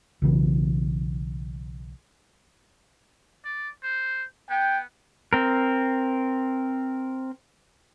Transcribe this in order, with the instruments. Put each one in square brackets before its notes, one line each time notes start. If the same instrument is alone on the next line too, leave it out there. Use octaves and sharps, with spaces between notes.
[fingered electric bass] B1 C#3 E3
[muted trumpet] D5
C5
[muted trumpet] B3 [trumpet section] G5
[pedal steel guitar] C4 A#4